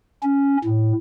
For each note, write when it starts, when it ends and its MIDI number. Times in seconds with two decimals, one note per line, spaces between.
0.23 0.57 61
0.64 0.92 45